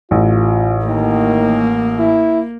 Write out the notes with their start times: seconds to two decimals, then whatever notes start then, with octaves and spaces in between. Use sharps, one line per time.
0.11 A1 F4
0.86 D#3 A#3
1.99 E4